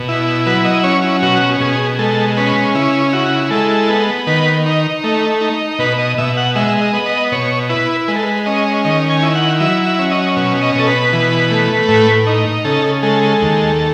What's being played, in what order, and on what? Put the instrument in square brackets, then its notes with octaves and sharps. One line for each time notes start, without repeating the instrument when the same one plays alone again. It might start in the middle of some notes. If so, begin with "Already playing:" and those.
Already playing: [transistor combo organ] B2
E4
F#3 B4
D#5
C#4 C#5
E4
B2 F#4
B2 G#4
G#3 A4
C#4 B4
C#3 E4
E4 F#4
G#3 A4
B3
D#3 B4
D#4
A3
D#4
B2 B4
D#5
B2 E5
F#5
G#3 E5
D#5
B3
D#5
B2 C#5
E4 B4
G#3 B4
A4
B4
C#4 D#5
D#3 D#5
G#5
E4
F#5
F#3 E5
E5
C#4
D#5
B2
D#5
B2 A4
B4
E3
A3
A2
D#4
C#3 A4
G#3 A4
D#2